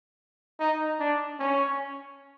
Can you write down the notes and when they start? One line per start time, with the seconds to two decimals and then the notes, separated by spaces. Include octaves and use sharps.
0.60 D#4
0.99 D4
1.39 C#4